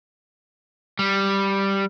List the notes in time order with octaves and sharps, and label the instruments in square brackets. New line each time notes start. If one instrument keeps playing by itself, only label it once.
[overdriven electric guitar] G3